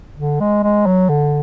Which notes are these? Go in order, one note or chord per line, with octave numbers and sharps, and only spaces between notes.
D3
G#3
G#3
F#3
D3